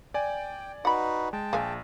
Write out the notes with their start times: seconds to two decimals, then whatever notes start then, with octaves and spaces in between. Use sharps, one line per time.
0.14 D5 G5 G#5
0.85 D#4 F#4 B4 F#5 B5
1.33 G#3 G5 A5
1.53 A#1 G#3 F5 G#5